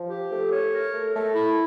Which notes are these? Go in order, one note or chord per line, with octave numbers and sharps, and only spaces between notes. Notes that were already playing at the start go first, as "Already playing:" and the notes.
Already playing: F3
G4
A3
C#5
A#4
A3
A3
E4